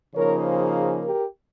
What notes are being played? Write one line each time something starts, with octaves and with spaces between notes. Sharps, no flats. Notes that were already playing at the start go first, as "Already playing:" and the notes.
C#3 F3 A#3 D#4 A#4 C#5
G#4 C5
G#4 C5
G4 A#4